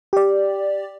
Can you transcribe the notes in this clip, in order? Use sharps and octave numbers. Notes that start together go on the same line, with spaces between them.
G4 D5